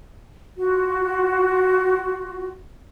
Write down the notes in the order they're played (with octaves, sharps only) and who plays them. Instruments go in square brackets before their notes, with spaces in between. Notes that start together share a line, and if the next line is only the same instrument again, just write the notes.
[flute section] F4 F#4